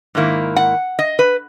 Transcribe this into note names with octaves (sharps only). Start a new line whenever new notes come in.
G#2 D#3 A#3 E4
F#5
D#5
B4